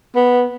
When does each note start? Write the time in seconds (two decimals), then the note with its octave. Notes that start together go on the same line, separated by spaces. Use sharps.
0.15 B3